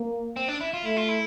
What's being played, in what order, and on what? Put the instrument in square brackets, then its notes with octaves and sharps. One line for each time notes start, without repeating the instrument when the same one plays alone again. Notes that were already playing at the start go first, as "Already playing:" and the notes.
Already playing: [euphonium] A#3
[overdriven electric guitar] C4
D4
E4
F4
[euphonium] A3 [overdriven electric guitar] E4
[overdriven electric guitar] F4
E4